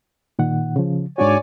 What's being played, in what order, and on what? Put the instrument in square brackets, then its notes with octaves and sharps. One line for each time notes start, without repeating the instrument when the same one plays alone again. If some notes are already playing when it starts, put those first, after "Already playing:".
[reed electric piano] A#2 D#3 F#5
C#3 F3
[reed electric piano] G#2 D4 F#4 [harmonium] C#5 D5 G#5